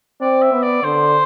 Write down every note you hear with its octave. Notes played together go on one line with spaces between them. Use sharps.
C4 D5
E5
B3
D5
D3 C5